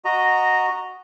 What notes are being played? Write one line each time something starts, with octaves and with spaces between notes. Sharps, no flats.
F#4 D#5 A#5